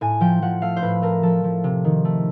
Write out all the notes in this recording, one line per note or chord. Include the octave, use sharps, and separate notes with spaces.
A2 G#5
F3 G5
F3 F#5
A3 F5
C5
A2 B4
A3 A#4
F3 A4
F3
C3
D#3
A3